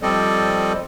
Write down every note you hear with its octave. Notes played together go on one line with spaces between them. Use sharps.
F3 G3 C4 A4 D5 D#5